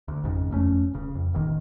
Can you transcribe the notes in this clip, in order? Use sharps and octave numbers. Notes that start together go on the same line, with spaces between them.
D2
G#1 F2 G#2 C#3
F1 F2 A3 C#4
D1 C#3
F2
E1 A1 D#3